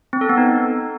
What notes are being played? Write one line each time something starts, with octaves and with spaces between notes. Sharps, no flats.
C4
A4
B3
D#4